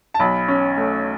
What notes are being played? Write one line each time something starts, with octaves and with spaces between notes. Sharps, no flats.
A5
B1 B5
C#4
A3